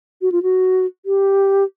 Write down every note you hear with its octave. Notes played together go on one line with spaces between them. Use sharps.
F#4
F4
F#4
G4